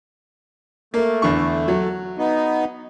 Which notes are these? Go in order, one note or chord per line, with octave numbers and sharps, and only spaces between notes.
A3 A#3
E2 D3 C#6
F#3
B3 D#4